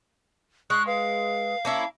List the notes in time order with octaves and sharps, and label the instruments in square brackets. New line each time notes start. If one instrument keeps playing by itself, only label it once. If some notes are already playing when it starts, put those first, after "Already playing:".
[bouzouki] G#3 [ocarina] C#6 [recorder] F#6
[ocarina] B4 [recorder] F5
[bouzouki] A#3 C#4 E4 [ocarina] A5